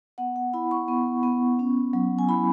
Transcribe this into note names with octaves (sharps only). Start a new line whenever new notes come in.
B3 F#5
F#5
E4 B5
C#6
B3
B3
C#4
F#3
G#5
E4 B5